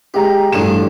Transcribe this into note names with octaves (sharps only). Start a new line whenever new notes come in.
G#3 G4 A#5
A1 G2 D3 F3 E7